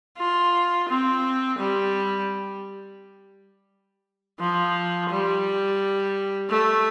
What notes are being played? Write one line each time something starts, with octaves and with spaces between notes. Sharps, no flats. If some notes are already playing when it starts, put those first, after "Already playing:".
F4
C4
G3
F3
G3
A3